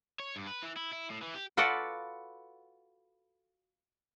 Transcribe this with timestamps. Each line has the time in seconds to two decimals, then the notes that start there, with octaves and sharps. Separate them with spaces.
0.20 C#5
0.36 G2
0.47 B4
0.63 E3
0.77 E4
0.93 E4
1.11 A2
1.22 E3
1.35 G4
1.57 F4 F#4 A4 B4 D5 F#5